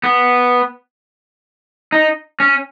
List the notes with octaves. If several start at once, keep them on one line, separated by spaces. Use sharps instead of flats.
B3
D#4
C#4